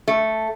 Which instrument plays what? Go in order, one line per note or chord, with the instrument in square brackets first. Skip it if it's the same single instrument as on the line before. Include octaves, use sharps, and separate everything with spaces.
[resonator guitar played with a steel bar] A3